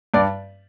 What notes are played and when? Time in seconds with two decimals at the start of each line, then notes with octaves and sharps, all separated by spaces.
0.14 G2 D5